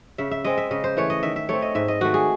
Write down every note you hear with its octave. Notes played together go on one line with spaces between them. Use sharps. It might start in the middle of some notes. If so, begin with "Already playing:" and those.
C#3 E5
E5
G#3 C4 D#5
E5
C#3 D#5
C5
E3 A3 C#5
D#5
D#3 E5
E5
A3 C4 C#5
D#5
G#2 E5
D#5
D#3 A3 F#4
G#4